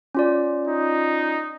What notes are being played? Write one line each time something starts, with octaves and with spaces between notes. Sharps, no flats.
C#4 F4 D5
D#4